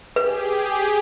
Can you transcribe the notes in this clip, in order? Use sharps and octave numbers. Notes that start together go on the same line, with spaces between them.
G4 G#4 B4